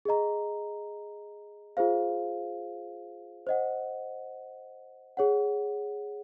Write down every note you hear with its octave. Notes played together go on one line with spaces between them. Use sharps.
G#4 D#5 A#5
F4 G#4 C5 F5
C5 D#5 F#5
G#4 C#5 F#5